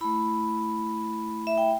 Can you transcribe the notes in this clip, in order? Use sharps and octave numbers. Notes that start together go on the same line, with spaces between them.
A3 E4 B5
E5
G5